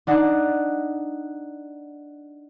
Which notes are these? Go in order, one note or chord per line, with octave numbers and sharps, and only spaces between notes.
D4 D#4 F#5